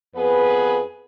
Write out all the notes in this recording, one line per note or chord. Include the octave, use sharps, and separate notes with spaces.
F2 B3 G#4 B4